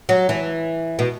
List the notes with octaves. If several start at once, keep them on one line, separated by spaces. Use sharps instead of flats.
F#3
E3
B2